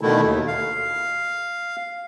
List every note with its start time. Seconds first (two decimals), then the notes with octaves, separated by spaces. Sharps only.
0.01 B2 D3 D#3 A3 E4
0.24 D#2
0.47 F5